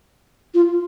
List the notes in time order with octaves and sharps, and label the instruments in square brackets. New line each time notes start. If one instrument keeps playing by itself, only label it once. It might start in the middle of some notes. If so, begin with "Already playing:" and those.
[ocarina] F4